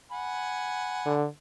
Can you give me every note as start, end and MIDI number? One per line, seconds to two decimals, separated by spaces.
0.12 1.14 78
0.12 1.14 80
0.12 1.14 83
1.06 1.26 50